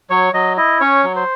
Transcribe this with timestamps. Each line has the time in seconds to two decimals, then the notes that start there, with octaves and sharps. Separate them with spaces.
0.10 F#3 C#5
0.33 F#3 D#5
0.57 E4 D#5
0.81 C#4 C#5
1.04 F#3
1.16 C5